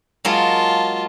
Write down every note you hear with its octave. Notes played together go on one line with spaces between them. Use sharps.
F#3 G#3 A#3 F4 A5